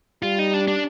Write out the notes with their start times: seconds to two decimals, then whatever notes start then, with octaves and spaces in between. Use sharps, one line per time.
0.23 G3 F4
0.39 D#4
0.54 D4
0.68 D4